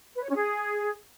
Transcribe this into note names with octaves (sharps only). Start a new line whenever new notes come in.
B4
C#5
C#4
G#4